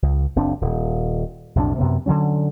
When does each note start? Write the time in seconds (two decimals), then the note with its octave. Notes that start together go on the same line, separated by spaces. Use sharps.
0.02 C#2
0.36 F#1 C4 D4
0.61 D#1
1.55 B1 F2 A2 D4
1.78 F#2 C3 B3
2.06 D3 F3 F#3 C#4